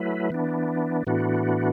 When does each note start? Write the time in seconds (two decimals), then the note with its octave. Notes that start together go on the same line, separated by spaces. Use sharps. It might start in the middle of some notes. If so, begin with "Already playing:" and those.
Already playing: F#3 A3 E4 B4
0.30 E3 B3 D4
1.07 A2 E3 B3 D4 F#4